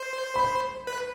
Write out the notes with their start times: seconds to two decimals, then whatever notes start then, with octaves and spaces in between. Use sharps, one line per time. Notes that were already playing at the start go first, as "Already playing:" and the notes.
Already playing: C5
0.36 B5
0.87 B4